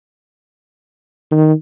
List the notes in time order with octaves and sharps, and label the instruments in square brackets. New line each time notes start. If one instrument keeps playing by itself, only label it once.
[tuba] D#3